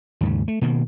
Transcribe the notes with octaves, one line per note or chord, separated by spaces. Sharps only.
D#2 G#2 C#3
A3
B2 D#3 A#3